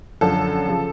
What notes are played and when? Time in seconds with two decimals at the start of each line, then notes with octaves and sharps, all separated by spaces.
0.21 F#2 D3 F3 A4
0.68 C#3 F3